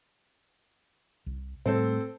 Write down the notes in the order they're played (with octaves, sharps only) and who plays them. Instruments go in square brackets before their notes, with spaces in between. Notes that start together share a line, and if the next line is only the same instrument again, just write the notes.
[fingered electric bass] C2
[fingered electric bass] A2 G3 A3 [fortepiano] C4 A4 C5